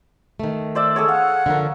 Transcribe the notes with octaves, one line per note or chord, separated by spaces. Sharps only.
D#3 A3
C5 D5 E5
G#4 A4 C#5
F5 F#5
D3 F3 A#4